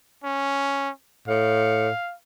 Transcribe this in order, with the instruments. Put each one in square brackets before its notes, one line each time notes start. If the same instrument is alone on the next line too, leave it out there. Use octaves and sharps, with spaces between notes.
[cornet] C#4
[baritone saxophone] A2 [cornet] F5